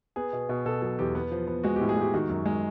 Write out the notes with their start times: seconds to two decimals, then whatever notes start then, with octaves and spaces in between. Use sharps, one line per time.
0.16 B3 G#4
0.33 B2
0.49 B2
0.66 B2 A4
0.82 F#3 A4
0.99 E2 G4
1.15 B3
1.32 F3
1.48 B3
1.64 G#3 F#4
1.76 A2 G4
1.89 G#4
1.97 G#3 G4
2.14 D#3 F#4
2.29 F#2
2.46 G#3